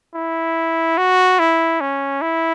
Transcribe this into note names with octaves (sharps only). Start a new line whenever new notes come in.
E4
F#4
E4
C#4
E4